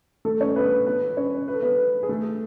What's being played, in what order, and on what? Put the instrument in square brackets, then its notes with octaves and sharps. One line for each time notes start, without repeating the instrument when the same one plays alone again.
[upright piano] A3 A4
C#4 C#5
B3 B4
B3 B4
C#4 C#5
B4
A4
B3 B4
G#4
A3 A4